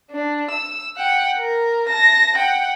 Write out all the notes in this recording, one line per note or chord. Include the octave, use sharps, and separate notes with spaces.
D4
E6
F#5 G5
A#4
A5 A#6
F#5 G5